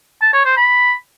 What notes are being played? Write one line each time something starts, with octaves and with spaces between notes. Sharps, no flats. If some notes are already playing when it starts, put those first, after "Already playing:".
A5
C#5
C5
B5